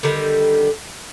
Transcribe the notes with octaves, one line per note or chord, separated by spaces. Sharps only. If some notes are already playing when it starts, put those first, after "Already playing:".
D3 D#3 G3